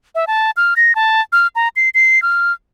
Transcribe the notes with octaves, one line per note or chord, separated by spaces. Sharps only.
E5
A5
F6
A#6
A5
F6
A#5
C7
C7
F6